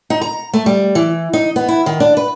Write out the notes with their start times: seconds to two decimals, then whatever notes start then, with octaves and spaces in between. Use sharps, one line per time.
0.10 D#4
0.21 A#5
0.53 A3
0.66 G3
0.95 E3
1.33 D#4
1.56 B3
1.68 E4
1.86 D#3
2.00 D4
2.17 B4